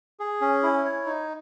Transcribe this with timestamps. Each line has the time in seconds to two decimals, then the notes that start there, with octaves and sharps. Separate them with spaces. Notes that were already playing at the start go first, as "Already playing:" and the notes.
0.20 G#4
0.41 C#4
0.63 E4
0.85 C#5
1.06 D#4